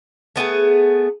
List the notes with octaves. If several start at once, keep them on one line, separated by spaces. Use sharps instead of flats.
A3 B3 G4 G#4